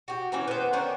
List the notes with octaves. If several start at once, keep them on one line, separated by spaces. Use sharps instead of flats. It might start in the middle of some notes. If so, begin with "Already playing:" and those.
F#4 G4
E3 A#3 C4 C#4
B3 C5
D#3 A#3 C#4 D4